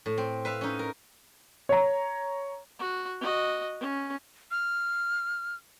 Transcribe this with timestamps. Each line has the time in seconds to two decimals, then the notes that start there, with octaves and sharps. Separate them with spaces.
0.06 A2
0.18 C4
0.45 B4 E5 F5
0.61 C#4 D#4
0.79 A#4
1.69 C#5 A#5
2.79 F#4
3.21 F#4 D#5
3.80 C#4
4.51 F6